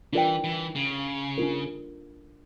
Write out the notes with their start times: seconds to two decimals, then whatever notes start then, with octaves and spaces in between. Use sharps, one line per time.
0.13 E3 D4 F4 A#4 D5 G5
0.44 E3
0.75 C#3
1.38 D4 F4 A#4